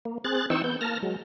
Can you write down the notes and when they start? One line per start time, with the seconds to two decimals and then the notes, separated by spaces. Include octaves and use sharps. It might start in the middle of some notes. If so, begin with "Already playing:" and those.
0.05 A#3
0.24 C4 G#4 F#6 A6
0.50 E3 C4 D#4 G5 C#6 E6
0.64 B3 G6
0.81 A#3 A5 F6 A#6
1.02 F#3 G#3